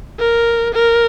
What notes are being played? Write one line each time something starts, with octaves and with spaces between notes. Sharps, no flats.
A#4
A#4